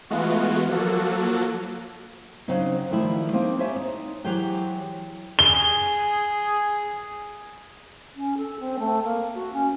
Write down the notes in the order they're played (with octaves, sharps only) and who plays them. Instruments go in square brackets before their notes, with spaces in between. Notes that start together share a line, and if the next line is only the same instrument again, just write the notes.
[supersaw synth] E3 G#3 A3 B3 F4 F#4
F3 F#3 A#3 F#4 A4
[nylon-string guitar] C#3 F#3 C4 D#4
D#3 F3 G3 A3 E4
A#3 C4 D#4 G4
C4 G4 C#5 E5 G#5
D#4
E3 F#3 G4 G#4 C5 G5
[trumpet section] G#4 [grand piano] G7
[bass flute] C#4
A4
C4
A3
A#3
F#4
C#4